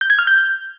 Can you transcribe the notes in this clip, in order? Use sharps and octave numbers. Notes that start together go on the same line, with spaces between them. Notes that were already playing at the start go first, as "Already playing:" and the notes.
G6
G#6
F6
G6